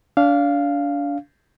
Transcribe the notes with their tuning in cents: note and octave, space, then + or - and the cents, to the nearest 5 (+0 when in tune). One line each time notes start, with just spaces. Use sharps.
D4 -30 F5 -5